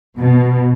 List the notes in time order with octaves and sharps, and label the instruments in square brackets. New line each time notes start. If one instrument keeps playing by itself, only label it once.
[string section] B2